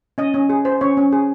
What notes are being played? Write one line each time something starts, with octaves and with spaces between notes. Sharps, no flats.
C#4 D#5
C#4
G#4
C5
C#4 C#5
C#4
G#4